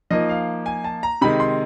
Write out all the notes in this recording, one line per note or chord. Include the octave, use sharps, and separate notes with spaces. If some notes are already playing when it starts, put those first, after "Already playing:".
F3 A#3 D#4 D#5
F5
G#5
A5
A#5
C3 D#3 G#3 B5
C6